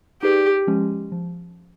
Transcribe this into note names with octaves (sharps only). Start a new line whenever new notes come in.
D#4 G4 G#4 B4 D5
F3 G#3 C#4
F3